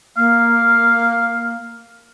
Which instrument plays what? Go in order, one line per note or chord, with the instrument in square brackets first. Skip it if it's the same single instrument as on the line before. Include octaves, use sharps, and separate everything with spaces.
[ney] A#3 [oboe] F5